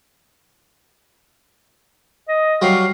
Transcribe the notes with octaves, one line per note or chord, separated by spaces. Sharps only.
D#5
F#3 G3 F5